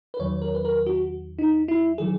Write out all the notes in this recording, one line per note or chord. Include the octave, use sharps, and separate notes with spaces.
B4
E2 D#3 F#3 C#5
A#4
B4
A#4
F#4
D#4
E4
D#3 F#3 G#4